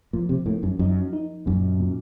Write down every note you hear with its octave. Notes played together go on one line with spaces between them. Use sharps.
A#2 F3
C3
A2 A#3
F#2
F#2 D#4
D#4
F#2 A#2
A#2